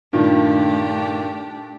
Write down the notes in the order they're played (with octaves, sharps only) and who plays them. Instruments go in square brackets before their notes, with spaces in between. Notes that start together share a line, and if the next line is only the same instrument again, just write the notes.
[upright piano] G2 A#2 D#3 [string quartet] A3 D4 G4